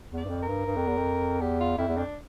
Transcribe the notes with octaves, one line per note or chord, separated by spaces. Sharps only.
E2
D5
G2
F2
A#4
G2
G2
F2
E2
F2
E2 G4
F4
F2 E4
E2
F2 D4